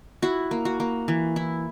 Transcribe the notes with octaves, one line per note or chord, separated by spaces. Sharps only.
E4 F#4
A#3
F#4
A#3
E3
E4